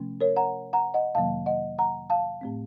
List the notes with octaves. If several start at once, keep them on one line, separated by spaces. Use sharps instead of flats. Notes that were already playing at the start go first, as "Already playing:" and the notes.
Already playing: C3 F3 A3 C#4
A#4 C#5
F#5 A#5
F#5 A#5
D#5 F#5
F2 C3 D#3 F#3 A#3 F5 A5
D#5 F#5
F#5 A#5
F5 A5
A2 A3 C4